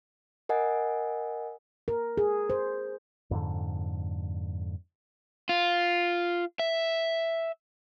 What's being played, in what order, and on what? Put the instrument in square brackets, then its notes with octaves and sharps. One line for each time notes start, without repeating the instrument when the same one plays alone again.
[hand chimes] A#4 D#5 F#5 G#5
[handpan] A#4
G#4
C5
[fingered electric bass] F2 G#2 D3
[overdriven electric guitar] F4
E5